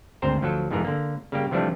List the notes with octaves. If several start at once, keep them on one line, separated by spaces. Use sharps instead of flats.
G#1 D2 C4 C5 A#5
D2 F3 F#3 A4
F2 G#2 C3 E3 G#4 A#4
D3 A#3
C#3 G3 A#3 G4
C3 E3 F3 G3 A3 D4